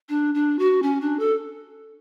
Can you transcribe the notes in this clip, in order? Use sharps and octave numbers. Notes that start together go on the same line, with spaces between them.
D4
D4
F#4
C#4
D4
A4